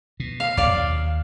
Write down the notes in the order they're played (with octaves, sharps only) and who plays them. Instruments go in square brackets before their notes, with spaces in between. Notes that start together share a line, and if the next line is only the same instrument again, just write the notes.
[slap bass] B2
[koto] F5
[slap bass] E1 A#1 F#2 [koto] D5 F5
[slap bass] D#2